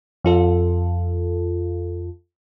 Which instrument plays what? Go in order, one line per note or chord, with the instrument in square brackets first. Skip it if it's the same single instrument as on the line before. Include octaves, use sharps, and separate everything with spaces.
[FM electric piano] F2 F4 A4